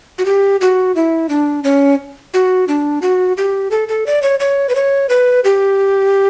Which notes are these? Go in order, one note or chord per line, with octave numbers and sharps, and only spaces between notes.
F#4
G4
F#4
E4
D4
C#4
F#4
D4
F#4
G4
A4
A4
D5
C#5
C#5
B4
C#5
B4
G4